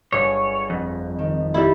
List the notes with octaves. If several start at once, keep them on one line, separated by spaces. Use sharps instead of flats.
G1 G#4 C#5 C#6
F2
D#3
G3 E4